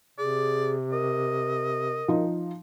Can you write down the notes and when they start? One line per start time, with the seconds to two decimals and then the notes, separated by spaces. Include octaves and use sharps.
0.19 C3 G#4 D5
0.92 A#4 D#5
2.08 F3 D#4